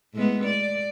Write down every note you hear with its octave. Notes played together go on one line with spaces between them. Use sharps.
A2 G#3 B3
D5